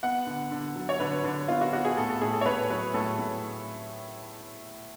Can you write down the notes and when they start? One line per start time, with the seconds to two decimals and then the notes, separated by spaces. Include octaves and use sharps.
0.03 B3 F#5
0.27 D3
0.51 D3
0.76 F#3
0.89 C#5
1.00 D3 B4
1.24 D3
1.48 B3 F4
1.61 F#4
1.72 B3 F#4
1.85 G#4
1.97 A2 A4
2.10 A4
2.21 A2 G#4
2.33 A4
2.41 C#5
2.46 A2 B4
2.70 F#3 B4
2.94 A2 A4
3.19 A2